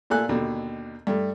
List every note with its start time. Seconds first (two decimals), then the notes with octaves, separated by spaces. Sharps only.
0.10 A#2 A3 A4 G#5 F#6
0.29 D#2 B2 D3
1.07 G2 A3